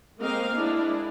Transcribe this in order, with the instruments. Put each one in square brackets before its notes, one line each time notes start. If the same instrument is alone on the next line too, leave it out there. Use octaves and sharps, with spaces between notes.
[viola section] G#3 A#3 C4 A#4 D#5 F5
G#3 D4 E4